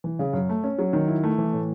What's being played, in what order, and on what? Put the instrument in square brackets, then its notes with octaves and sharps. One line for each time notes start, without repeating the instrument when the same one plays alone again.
[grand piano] E3
C#3
F#2
A3
C#4
F#3
D#3
E4
A3
E3
A2